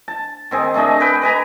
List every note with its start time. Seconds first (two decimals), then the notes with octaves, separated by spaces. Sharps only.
0.08 A5
0.51 D#3 C4 G#4
0.74 A3 D4 G#4 D#5
1.00 G#4 B4 G5
1.22 B4 D#5 G#5 A#5